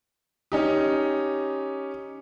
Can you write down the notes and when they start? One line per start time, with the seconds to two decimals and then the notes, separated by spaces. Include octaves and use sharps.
0.52 C#4 D#4 G4